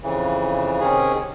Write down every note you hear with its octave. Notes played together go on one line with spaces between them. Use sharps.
F2 C#3 E3
C3 D#3 C#4 G#4